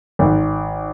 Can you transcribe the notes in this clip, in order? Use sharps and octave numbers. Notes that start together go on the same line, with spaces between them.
G#1